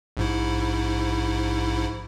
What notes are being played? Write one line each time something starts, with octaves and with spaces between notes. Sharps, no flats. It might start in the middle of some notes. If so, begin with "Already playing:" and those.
A#1 G#2 E4